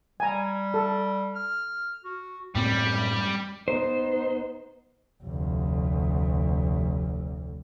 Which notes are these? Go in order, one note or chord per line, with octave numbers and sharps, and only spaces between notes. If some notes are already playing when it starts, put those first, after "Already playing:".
G3 G#5 A#5
A4
F6
F#4
F#2 A2 G3 C4
B3 D#4 C5
F1 D2